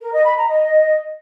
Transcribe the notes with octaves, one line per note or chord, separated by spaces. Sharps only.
A#4
D#5
B5
A#5
D#5